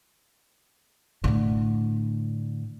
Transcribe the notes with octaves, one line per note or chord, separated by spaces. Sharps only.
A2 D3